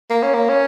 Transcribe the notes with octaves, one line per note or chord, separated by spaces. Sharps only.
A#3
C#4
A#3
C#4